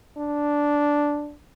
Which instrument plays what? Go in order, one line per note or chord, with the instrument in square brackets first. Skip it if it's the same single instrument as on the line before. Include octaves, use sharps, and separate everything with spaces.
[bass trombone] D4